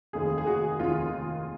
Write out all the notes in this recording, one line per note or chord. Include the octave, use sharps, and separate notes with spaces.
F1 D#2 D#3 G#4
G#4
F#4
F1 D#2 D#3 F4